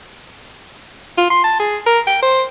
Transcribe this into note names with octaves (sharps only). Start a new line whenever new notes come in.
F4
C6
A5
G#4
A#4
G5
C5